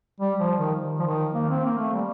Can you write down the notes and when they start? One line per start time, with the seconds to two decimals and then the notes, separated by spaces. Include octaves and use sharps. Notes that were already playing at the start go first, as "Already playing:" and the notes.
0.20 G3
0.39 F3
0.58 D#3
0.99 F3
1.06 D#3
1.34 A#3
1.49 C4
1.64 A#3
1.78 A3
1.92 G3